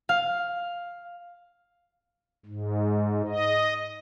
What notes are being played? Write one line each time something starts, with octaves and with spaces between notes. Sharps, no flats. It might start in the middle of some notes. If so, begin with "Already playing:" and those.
F5
G#2
D#5